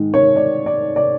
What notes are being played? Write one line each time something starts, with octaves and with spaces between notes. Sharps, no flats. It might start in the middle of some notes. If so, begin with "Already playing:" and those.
Already playing: G#2 D#3 G#3
C#5
D5
D5
D5